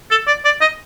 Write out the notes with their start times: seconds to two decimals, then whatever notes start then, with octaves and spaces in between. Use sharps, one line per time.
0.11 A4
0.27 D5
0.45 D5
0.61 D#5